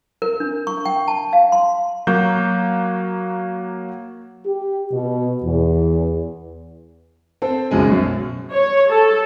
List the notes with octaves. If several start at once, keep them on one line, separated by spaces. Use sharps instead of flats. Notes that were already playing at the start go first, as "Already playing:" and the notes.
A#4
D4
C#6
G5
A5
F5
C6
F#3 A#3 F#4 G6
G4
B2
E2
C4 A4 C5
F#1 B1 F#2 C#3 G#3 G#5
F#2 B2
C#5
A4